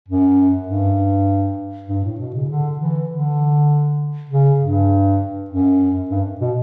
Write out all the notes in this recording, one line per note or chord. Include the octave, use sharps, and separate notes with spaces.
F#2
G2
G2
A2
B2
C#3
D3
E3
D3
C#3
G2
F#2
G2
B2